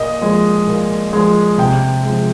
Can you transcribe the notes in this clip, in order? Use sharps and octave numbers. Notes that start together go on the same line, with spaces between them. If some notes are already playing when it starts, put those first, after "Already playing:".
Already playing: A#2 D#5
F3 G#3
A#2
F3 G#3
C3 G5
F3 G#3